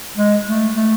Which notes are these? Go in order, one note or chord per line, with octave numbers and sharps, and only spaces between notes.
G#3
A3
A3